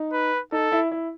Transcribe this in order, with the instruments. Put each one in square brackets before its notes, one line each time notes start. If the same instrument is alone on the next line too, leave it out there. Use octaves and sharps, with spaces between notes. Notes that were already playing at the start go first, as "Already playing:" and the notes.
Already playing: [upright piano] D#4
[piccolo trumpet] B4
[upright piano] D#4 [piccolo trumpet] A4
[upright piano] E4
E4